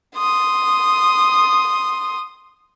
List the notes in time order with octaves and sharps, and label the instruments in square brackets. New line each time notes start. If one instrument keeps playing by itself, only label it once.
[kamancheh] C6 D#6